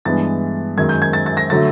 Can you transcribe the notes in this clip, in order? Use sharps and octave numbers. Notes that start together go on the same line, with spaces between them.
G2 E3 G#3 B3 E4 A6
F#2 D#3 G#3 G#6
G6
G#6
A6
A6
A#6
D3 F#3 A3 A6